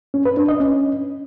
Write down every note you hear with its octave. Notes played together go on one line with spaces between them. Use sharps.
C#4
B4
D4
D#5
C#4